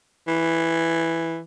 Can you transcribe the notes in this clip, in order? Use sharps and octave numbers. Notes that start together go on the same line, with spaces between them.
E3